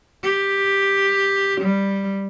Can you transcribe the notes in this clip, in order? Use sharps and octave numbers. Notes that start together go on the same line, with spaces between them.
G4
G3